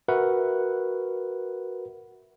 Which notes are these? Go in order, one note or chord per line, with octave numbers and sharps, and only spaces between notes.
F#4 A#4 B4 E5 F#5